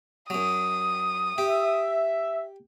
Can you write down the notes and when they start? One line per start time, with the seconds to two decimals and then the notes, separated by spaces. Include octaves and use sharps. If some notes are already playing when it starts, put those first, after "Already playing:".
0.30 F#2 F#3 D#6
1.38 G4 E5